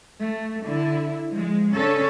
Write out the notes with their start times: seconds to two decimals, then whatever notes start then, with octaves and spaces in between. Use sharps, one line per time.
0.21 A3
0.66 D3 E4
1.32 F3 G#3
1.76 C#3 C#4 D4 A4